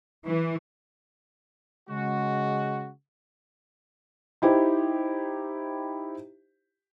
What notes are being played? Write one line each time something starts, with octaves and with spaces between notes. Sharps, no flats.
E3
C#3 G#3 F#4
D#4 E4 G4 C5